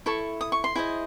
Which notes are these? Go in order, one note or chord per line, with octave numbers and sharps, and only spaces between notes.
E4 A4 C#6
D#6
C#6
C6
E4 G#4 C5 D#5